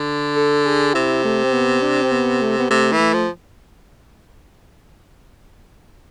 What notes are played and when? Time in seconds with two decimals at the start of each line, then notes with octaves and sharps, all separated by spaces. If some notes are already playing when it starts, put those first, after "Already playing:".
Already playing: D3
0.36 A4
0.66 G#4
0.94 C3 E4
1.24 A3
1.44 C4
1.53 B3
1.82 D4
2.02 C4
2.12 B3
2.42 A3
2.59 B3
2.70 C3 A3
2.92 E3
2.99 A3
3.14 F3